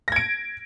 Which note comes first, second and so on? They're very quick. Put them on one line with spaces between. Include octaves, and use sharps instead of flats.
A#6 G#6 D7